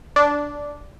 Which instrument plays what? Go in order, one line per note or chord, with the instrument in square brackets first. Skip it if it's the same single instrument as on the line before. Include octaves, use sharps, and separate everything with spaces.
[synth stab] D4